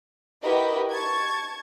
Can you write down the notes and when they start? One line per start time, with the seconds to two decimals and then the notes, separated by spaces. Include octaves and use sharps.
0.43 E4 F#4 G4 A#4 B4 D#5
0.91 A5 C#6 G#6